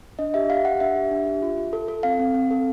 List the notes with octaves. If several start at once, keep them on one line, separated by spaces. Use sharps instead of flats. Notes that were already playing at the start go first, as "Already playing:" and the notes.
D4 D#5
G4 E5
G4 F5
G4 F#5
D4 E5
G4
D4
G4
F4
F4
A4
A4
C4 F5
C4
C4
A4